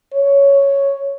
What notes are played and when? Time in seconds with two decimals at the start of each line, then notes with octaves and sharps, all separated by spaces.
0.13 C#5